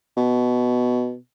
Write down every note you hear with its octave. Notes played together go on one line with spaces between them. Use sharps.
B2